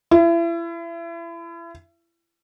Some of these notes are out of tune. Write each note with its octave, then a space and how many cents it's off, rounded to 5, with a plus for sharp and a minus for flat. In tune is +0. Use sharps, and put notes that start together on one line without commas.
E4 +35